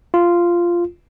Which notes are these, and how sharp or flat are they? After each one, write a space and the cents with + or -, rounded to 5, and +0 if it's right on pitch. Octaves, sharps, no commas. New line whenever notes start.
F4 -10